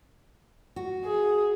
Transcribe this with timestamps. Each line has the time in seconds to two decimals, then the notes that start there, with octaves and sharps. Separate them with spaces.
0.76 F#4
1.06 G#4